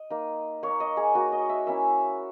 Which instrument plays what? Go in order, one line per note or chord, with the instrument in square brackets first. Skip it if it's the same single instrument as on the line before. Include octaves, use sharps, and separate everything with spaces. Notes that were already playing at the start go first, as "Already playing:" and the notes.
Already playing: [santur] D#5
A#3 D#4
A#3 D#4 C#5
D#5
G#4
A#3 D#4 F#4
D#5
E5
A#3 C#4 E4 E5